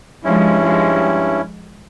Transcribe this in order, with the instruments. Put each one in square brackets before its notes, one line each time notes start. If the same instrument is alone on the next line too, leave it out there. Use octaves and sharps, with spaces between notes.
[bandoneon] G2 G3 C#4 E4 [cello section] F3 G#3
[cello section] F3 G#3